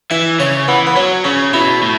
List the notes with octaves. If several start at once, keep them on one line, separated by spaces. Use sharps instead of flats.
E3 E5
C#3 C#5
E3 B3
B3
F#3 C#4
C#3 C#4
B2 E4
A2